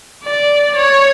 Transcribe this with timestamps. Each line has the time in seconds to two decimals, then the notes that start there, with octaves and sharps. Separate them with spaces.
0.24 D5
0.76 C#5